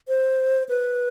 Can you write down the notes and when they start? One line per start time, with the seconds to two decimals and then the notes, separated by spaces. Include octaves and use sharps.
0.08 C5
0.69 B4